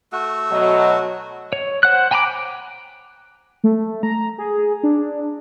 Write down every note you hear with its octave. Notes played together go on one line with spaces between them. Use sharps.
A3 F#4
B2 F#3 D#5
C#5
C5 F#5 F#6
G5 G#5 A#5 B5 D6
A3
A#5
G#4
D4